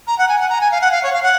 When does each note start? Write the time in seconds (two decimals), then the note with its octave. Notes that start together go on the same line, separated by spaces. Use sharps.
0.07 A#5
0.18 F#5
0.28 G#5
0.39 F#5
0.49 A#5
0.61 G#5
0.71 F5
0.81 F#5
0.91 F5
1.03 C#5
1.13 F5
1.23 F#5